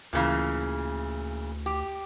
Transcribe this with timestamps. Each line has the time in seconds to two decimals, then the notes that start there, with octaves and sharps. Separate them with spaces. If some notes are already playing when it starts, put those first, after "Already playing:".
0.13 D2 A#2 C#3 E3
1.66 G4